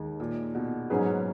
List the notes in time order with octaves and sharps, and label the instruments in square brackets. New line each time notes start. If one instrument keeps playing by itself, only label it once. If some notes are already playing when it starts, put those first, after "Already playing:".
Already playing: [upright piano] D#2 D#3 G#3
[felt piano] A#2
B2
[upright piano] G#2 F#3 C#4 G#4 B4